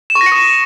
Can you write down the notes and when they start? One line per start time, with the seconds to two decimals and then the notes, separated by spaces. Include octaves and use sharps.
0.10 E7
0.15 C#6
0.21 A#6
0.26 C#7
0.32 D#6